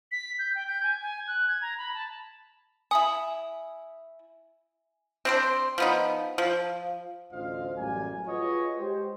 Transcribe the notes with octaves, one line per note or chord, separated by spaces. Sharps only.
B6
G6
G5
G6
G#5
G#5
F#6
G#6
A#5
B5
A5
E4 G#5 B5 D#6
C4 D4 C5
F3 B3 D#4
F3
A1 D2 F4 C5 D#5 F5
A1 F#2 F#3 G3 A#3 G#5
F4 F#4 G#4 B4 C#5 D#5
G#3 G4 C5